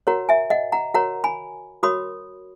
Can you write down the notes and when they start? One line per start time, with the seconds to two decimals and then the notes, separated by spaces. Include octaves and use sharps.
0.07 F#4 A#4 C#5 F#5 A#5
0.29 E5 G#5
0.50 D#5 F#5
0.72 F#5 A#5
0.94 F#4 A#4 C#5 F#5 A#5
1.24 G#5 B5
1.83 F#4 A#4 C#5 B5 D#6